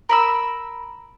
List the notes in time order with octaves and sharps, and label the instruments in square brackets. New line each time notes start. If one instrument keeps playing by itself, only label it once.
[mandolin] A#4 B5 E6